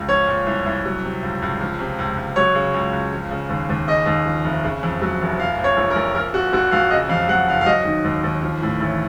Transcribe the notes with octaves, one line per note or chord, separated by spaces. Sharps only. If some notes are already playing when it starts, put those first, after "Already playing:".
Already playing: C#2
F3 C#5
A#2
C2
C2
F#3
C3
C#2
C#2
F3
C3
C#2
C#2
F#3 C#5
C#3
C#2
C#2
F3
C#3
D#2
D#2
C#3 D#5
D#2
F3
F1
C#3
F2
F#3
F1
F3 F5
A#2
C#5
A#1
A#4
A#1
F3 A#4
A#2 F#4
A#1 F#4
A#1 F5
C#3 D#5
F2 F5
F#3 F#5
F#1 F5
F5
F#3 D#5
D#3
D#2
D#2
F3
A2
A1